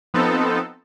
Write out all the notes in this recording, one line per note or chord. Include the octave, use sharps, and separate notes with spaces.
F3 B3 C4 D#4 A4